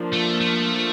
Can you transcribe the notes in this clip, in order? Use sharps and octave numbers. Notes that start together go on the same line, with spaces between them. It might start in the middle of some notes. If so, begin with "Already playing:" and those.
Already playing: F3 A#3 D4
A3
A3